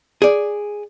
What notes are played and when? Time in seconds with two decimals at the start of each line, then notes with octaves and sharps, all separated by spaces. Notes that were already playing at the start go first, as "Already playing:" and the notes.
0.22 G#4 D5